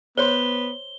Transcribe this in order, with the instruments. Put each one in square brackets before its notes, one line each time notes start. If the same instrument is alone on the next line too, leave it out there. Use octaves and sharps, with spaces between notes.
[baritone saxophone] B3 [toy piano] C5 C#5 C6 [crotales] G7